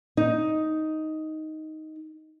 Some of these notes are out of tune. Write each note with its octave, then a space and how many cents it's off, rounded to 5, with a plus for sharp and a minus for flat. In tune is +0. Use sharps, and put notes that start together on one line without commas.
D#4 +5